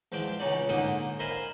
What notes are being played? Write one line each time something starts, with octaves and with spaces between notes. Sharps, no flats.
E2 F3 G#3 G5 D6
C#2 C#4 D#4 D5 F#5
G#2 D3 A#3 G5 D#6
A#4 C5 D#5 F5 G#5 B5